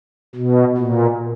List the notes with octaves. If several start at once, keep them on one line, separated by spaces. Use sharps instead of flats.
B2
A#2